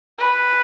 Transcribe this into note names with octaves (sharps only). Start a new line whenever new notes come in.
B4